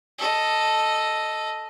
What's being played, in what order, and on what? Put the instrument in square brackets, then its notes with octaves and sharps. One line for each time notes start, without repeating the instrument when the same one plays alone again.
[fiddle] A4 D#5